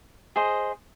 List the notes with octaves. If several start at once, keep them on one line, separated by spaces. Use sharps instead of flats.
G#4 C5 D#5